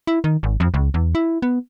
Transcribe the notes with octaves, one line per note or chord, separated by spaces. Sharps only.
E4
D#3
G#1
F2
C#2
E2
E4
B3